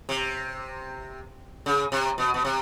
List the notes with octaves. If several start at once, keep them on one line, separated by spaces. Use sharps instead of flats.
C3
C#3
C3
B2
B2
C3